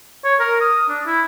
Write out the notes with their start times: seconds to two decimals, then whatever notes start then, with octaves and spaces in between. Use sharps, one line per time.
0.25 C#5
0.40 A#4
0.61 D#6
0.89 D4
1.06 E4